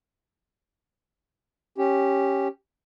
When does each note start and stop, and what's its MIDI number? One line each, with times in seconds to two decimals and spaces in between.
1.78 2.48 61
1.78 2.48 67